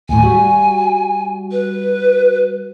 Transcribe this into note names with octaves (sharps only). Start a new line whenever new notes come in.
D#2 A2 G#5
G3 F#4
B4